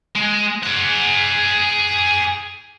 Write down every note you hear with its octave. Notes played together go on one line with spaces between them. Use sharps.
G#3
G#4 F#5